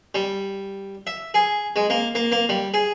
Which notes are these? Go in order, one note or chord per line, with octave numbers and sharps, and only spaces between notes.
G3
E5
G#4
G#3
A#3
A#3
A#3
G3
G#4